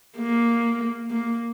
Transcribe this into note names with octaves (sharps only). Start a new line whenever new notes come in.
A#3
A#3